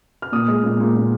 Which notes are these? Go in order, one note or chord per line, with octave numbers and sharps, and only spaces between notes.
F6
A#2 D#6
G#3
A#2
A#2
A#2